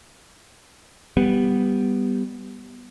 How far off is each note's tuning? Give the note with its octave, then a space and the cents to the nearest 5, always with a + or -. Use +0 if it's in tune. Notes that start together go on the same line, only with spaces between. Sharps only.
G3 +0 B3 +0